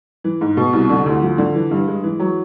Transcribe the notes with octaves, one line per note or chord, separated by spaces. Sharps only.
E3
G#2
B2
C2
D3
D2
F3
D3
E3
G2
G#3
E3
F#3